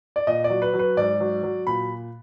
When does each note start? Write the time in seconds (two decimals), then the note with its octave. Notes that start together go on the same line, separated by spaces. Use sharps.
0.16 D5
0.27 A#2 D#5
0.44 D5
0.50 F#3
0.62 B4
0.74 F#3
0.79 B4
0.97 G#2 D5
1.20 F#3
1.43 F#3
1.67 A#2 B5